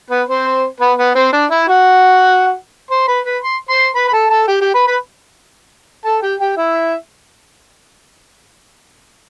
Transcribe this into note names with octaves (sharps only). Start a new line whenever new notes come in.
B3 B4
C4 C5
B3 B4
B3 B4
C4 C5
D4 D5
E4 E5
F#4 F#5
C5 C6
B4 B5
B4 B5
C6
C5 C6
B4 B5
B5
A4 A5
A4 A5
G4 G5
G4 G5
B4 B5
B4 B5
A4 A5
G4 G5
G4 G5
E4 E5